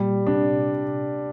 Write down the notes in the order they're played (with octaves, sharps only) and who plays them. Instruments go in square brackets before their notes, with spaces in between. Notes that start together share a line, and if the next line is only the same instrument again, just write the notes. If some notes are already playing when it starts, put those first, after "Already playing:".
Already playing: [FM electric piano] A#2 [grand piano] G3
[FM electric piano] C3 [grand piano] D4